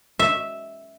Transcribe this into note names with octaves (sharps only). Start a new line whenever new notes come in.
E5